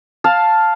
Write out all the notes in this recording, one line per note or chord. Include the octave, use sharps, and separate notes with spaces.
F5 A5